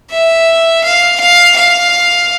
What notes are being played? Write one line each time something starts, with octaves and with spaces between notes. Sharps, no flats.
E5
F5
F5
F5